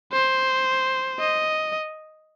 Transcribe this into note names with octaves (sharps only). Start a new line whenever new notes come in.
C5
D#5